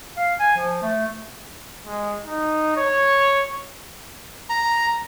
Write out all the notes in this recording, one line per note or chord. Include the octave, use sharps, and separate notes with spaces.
F5
G#5
F3
A3
G#3
D#4
C#5
A#5